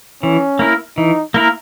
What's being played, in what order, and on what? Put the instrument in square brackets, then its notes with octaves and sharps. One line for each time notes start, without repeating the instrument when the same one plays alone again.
[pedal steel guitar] E3 [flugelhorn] C#4
[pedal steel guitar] A#3 E4 A#4
[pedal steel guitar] E3 [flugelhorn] D#4
[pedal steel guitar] A#3 E4 A#4